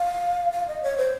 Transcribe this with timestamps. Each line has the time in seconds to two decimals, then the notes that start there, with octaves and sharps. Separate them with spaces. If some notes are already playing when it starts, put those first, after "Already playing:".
Already playing: F5
0.52 F5
0.67 D#5
0.83 C#5
0.98 C5